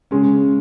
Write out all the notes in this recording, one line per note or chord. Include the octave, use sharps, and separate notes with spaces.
C#3 G#3 C#4